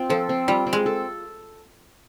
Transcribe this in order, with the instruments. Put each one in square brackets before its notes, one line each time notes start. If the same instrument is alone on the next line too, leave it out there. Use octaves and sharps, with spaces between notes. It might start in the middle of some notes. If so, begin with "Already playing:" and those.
Already playing: [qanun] C4 F4
[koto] F3 [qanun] A4
[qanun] C4
[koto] G3 [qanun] F4
[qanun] C4
[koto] G#3
[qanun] A4